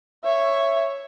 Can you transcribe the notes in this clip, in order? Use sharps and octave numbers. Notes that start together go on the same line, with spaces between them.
C#5 E5